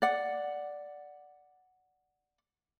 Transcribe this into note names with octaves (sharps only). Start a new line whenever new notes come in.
D5 F#5